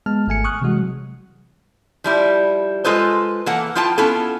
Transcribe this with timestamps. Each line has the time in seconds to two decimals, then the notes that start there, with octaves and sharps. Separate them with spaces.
0.06 G#3 B3 A5 F6
0.27 G#1 A3 G#5 C#7
0.44 C#6 D#6 F6 F#6
0.62 C3 E3 G3 G#3 F#4
0.77 F#3
2.04 F3 G3 E4
2.84 G#3 F4 A4 B4 C5
3.46 E3 A#3 A4 F#5
3.75 F3 E4 F4 G5 A5
3.98 B3 C#4 E4 F4 A4